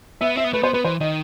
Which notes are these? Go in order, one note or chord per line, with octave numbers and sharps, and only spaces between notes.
B3 E5
C4 E5
B3
A3 B4
B3 C5
B3 B4
E3 C5
D#3 D#5